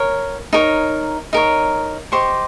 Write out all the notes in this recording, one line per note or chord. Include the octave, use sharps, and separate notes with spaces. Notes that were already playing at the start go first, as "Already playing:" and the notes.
Already playing: A#4 C#5
D#4 A#4 C#5
D#4 A#4 C#5
G4 C5 D#5 C#6